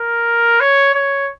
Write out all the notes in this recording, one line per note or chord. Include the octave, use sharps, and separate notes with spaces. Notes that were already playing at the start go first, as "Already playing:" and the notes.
Already playing: A#4
C#5
C#5